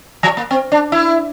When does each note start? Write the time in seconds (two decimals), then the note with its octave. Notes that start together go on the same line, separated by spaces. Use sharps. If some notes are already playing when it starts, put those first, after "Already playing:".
0.23 F3
0.37 A#3
0.51 C4
0.72 D4
0.92 E4